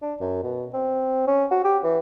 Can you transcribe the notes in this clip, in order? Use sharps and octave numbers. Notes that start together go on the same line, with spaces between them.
D4
F#2
B2
C4
C#4
F#4
G4
E3